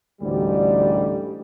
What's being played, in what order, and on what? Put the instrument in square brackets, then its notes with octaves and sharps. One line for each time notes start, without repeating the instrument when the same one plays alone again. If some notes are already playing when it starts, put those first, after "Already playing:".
[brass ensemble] A1 D2 G#2 G3